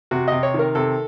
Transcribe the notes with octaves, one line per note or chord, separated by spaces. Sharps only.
C3 F#4
C3 D#5
C#5
D#3
A#4
C3 A4